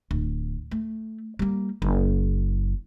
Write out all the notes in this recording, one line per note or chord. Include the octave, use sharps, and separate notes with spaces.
D1
A3
G3 A#3
F#1